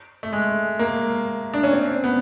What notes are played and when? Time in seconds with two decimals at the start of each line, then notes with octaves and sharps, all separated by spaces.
0.23 A3
0.33 G#3
0.79 A#3
1.54 D4
1.63 C#4
1.73 C4
2.04 B3